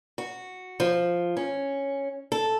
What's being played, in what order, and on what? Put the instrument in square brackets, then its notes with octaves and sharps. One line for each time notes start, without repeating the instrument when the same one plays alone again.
[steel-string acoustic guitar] F#4
F3
C#4
A4